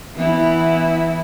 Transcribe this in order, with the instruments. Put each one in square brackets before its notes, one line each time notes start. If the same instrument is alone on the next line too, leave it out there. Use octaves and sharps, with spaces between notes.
[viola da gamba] E3 B3 E4